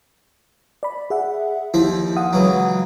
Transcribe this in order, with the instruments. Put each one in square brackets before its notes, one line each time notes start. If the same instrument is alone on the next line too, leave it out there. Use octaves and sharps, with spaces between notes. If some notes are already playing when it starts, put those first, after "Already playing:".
[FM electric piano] D5 B5
G#4 E5 F#5
[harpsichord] D#2 F3 E5 [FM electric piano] E4
[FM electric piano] F5 F#5 D#6
[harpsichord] C#2 E3 F#3